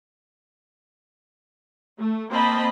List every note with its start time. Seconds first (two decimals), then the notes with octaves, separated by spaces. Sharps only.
1.99 A3
2.31 A#3 C4 C5 D#5 A5 B5